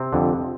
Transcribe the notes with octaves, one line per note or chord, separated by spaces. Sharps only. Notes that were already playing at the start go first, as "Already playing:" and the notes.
Already playing: C3 C4
F2 D3